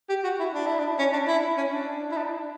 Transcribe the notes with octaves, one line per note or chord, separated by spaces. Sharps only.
G4
F#4
E4
D4
E4
D4
C#4
D4
E4
C#4
D4
E4
D4